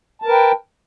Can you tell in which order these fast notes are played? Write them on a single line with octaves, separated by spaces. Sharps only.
A5 A#4 B4 G5